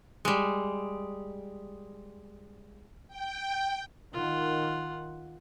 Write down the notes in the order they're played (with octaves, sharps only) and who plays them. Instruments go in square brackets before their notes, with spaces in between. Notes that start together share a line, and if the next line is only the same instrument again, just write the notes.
[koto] G3 G#3
[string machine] G5
[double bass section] D#3 [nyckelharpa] F4 F#5